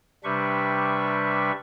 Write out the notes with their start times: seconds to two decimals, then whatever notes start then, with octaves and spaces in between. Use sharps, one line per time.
0.24 C3 G3 D4 B4 E5 C#6